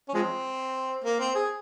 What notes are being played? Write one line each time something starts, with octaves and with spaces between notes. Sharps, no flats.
C#4
F3 G#3 C4
A#3
C4
G#4